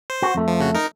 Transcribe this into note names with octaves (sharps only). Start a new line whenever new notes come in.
C5
F#4
F2 A3
F3
C#3 F#4
D#4 A#4